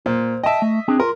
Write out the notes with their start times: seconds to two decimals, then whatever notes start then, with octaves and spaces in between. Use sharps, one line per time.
0.06 A#2 C5
0.44 D#5 E5 G5 A5
0.62 A3
0.88 C4 D4 G#4
1.00 F4 A#4